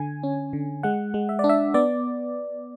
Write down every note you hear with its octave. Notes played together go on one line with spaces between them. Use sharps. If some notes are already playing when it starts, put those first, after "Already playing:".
Already playing: D3 G#5
C#4
D3
G#3 F#5
G#3
E5
D5
D4
E5
B3 D5